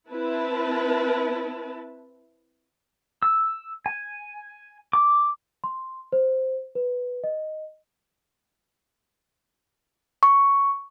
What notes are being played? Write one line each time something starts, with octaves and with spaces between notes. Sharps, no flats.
C4 E4 B4 A5
E6
G#5
D6
C6
C5
B4
D#5
C#6